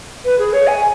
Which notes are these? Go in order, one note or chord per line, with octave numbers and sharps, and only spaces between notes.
B4
G#4
C#5
G#5